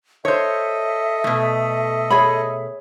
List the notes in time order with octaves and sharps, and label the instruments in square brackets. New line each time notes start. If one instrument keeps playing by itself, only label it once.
[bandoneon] A4 D#5 [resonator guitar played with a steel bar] C5 C#5 [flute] E5
[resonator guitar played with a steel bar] B2 A3
[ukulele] G#4 C#5 B5